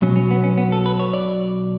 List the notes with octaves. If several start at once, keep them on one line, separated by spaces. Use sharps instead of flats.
B1 B2 F#3 C#4
C#4
B3
C#4
B3
A4
B4
C#5
D5